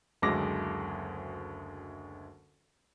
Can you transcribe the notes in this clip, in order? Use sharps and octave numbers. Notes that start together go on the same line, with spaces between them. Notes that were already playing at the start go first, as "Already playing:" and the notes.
F#1 D2 F#3 G#3 D6 A#6